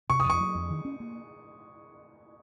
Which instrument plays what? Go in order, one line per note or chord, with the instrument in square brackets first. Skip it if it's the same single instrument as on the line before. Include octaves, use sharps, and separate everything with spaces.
[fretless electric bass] C3 [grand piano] C#6
[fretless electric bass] F2 [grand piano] D#6
[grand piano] C#6
[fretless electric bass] F#3
F2
D#3
C#4
A#3